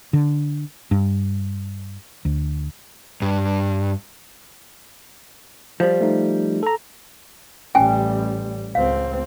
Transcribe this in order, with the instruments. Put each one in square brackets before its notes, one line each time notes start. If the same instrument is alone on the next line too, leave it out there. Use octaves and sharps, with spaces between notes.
[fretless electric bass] D3
G2
D2
[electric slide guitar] G2
[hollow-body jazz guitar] F3 G3
[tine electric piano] A3 D#4
A4 A#5
[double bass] A1 G3 [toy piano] C#4 G5 G#5
[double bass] C#2 C4 [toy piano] F5